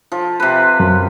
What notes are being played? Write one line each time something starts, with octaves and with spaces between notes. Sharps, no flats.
F3
C3 B4
F#2